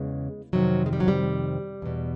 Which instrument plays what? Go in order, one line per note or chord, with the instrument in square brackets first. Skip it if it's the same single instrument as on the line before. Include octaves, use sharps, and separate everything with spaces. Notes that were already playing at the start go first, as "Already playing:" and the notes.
Already playing: [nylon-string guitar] E2 C#3 E3 G#3
F2 C3 D#3 F#3
G#3
G3
F#3
G3
E2 B2